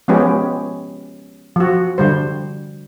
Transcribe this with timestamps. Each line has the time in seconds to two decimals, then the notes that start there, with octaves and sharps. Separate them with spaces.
0.08 F3 G#3 B3 C#4 G4
1.56 F3 F#4
1.98 D3 G3 C5